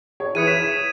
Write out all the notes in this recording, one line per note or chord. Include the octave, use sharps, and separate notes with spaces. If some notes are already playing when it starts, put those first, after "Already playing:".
G#4 C#5
E3 B4 D#6 G#6 C#7 D#7
B6 E7